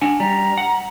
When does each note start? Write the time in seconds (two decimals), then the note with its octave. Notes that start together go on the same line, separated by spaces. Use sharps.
0.01 D4 F#5 G#5
0.20 G3 A#5
0.58 F#5